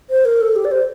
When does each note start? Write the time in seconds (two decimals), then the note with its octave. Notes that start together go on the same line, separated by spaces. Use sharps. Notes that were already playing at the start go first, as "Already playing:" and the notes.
0.10 C5
0.25 A#4
0.41 A4
0.56 G4
0.65 D5
0.71 C5